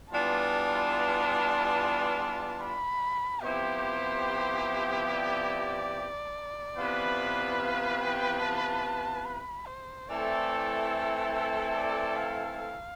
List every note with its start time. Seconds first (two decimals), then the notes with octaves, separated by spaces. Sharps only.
0.11 E3 G3 B3 D4 F4 A5
2.61 B5
3.43 C3 F3 B3 E4 G4 C5
5.10 D5
6.77 C3 E3 B3 F4 B4
7.60 F5
8.01 G5
8.42 A5
9.26 B5
9.67 C5
10.09 E3 A3 C4 E4 A4 D5
11.75 D5
12.16 F5
12.58 F5